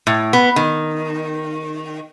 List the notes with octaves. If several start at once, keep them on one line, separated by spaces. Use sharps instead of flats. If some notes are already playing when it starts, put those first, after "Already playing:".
A2
B3
D#3